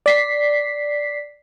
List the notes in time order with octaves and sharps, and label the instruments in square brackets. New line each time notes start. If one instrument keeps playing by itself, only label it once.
[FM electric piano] D5 B6 C7